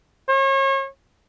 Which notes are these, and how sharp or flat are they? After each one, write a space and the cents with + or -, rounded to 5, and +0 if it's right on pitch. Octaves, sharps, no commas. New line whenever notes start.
C#5 -35